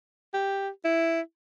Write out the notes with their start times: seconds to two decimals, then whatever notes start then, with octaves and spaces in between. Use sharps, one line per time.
0.33 G4
0.85 E4